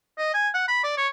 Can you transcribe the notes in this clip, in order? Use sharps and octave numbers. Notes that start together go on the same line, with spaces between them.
D#5
G#5
F#5
B5
D5
C#5